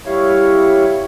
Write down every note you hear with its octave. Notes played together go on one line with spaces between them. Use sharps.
G3 E4 C#5 F5